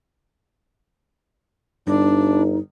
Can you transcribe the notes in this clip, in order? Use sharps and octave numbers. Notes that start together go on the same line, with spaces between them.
G1 G2 D4 D#4